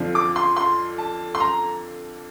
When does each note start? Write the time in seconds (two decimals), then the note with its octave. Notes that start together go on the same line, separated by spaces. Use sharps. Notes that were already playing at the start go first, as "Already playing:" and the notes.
Already playing: F2 D3 F3
0.15 D6
0.36 C6
0.57 C6
0.98 A5
1.35 C6
1.40 A#5